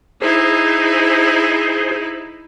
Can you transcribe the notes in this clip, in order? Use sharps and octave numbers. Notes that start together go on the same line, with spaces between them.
D#4 E4 G#4 C5